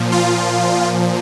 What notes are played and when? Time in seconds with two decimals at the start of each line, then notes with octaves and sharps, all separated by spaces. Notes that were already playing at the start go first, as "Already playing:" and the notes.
Already playing: A#2 F3
0.12 F4